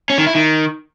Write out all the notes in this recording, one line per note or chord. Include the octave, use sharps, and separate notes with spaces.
C#4
D#3
E4
D#3